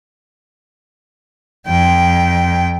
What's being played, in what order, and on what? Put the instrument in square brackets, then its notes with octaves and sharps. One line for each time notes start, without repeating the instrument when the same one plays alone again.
[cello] F2 G5